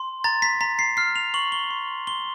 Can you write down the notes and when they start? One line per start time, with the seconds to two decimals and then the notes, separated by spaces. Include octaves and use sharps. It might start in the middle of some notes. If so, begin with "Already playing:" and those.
Already playing: C6
0.24 A#5 A6
0.42 B6
0.61 A#5 B6
0.79 C7
0.97 F6 C7
1.16 F7
1.34 C#6 F#7
1.52 G7
1.70 C6
2.07 C6 G7